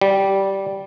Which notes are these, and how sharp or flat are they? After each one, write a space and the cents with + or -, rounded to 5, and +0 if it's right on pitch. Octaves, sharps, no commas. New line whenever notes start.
G3 -10